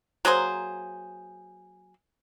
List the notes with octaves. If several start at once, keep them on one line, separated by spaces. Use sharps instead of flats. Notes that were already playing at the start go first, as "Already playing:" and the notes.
F#3 A#3 G#4 C5